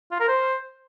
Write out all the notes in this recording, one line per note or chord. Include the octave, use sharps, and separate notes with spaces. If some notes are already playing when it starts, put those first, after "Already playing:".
F4
A#4
C5